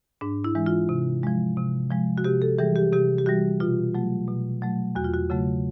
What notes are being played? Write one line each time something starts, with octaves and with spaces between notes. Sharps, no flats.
G#2 D4
E4
E3 G#3
F4
C3
F3 G#3
C3
F3 G#3
F#4
C3 G4
A4
E3 G3 G#4
G4
C3 G4
G4
E3 G3 F#4
B2 F4
F#3 A3
B2
F#3 A3
E2 F#4
F4
F#4
C#3 F#3 A3